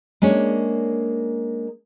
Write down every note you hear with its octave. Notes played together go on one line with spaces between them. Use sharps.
G#3 A#3 C#4 D4 C#5